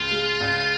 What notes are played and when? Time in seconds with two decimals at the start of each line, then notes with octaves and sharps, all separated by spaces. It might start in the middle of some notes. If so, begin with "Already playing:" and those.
Already playing: C#2 F4
0.11 G#3
0.41 C#2